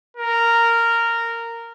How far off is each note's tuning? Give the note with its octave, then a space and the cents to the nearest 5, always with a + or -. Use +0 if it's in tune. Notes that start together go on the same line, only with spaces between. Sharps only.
A#4 -10